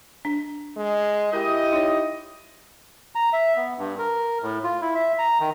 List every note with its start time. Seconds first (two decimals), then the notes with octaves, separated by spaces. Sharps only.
0.25 D4
0.76 G#3
1.33 E4 G4 A#4 D#5 G5
1.73 D#4 C#5
3.15 A#5
3.33 E5
3.57 B3
3.78 G2
3.99 A#4
4.42 A2
4.64 F4
4.81 E4
4.95 E5
5.19 A#5
5.40 D#3